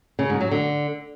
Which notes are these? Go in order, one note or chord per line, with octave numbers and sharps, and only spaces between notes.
C#3
G#2
F#3
D3